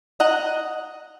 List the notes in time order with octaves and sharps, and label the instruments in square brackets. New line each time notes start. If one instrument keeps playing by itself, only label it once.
[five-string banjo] D#5 F#5 A#5